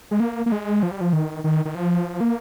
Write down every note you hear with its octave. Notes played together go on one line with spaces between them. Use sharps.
G#3
A#3
A#3
G#3
F3
G3
F3
D#3
D#3
D#3
F3
A#3